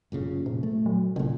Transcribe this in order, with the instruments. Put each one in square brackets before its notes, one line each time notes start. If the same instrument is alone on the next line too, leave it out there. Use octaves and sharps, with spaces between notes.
[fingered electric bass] F#1 A#2 C#3
[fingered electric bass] F1 [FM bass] A#2
[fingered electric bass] A3
[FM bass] F#3
[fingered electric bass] A#1 A#2 [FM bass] C#3